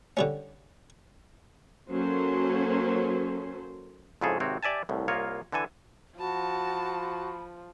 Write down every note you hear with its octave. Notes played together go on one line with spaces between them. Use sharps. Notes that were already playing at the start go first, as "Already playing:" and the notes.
D3 G3 C#4
F#3 A#3 C#4 A4 C5
F2 G#2 C#3 E4 G#4 A4
G#1 C3 C4 F#4 C#5
G4 D5 E5 G#5 A5
C2 A2
C2 A#3 F4 C#5 D#5
D3 E3 A4 G#5
F3 F#4 A5 B5